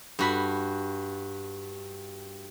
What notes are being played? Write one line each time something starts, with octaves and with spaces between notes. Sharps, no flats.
G2 F#4 B5